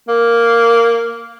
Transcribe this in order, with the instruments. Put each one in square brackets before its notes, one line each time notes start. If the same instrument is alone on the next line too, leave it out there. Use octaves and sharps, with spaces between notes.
[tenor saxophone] A#3